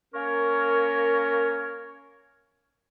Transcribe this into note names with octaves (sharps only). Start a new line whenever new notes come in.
A#3 C#4 A#4 C#5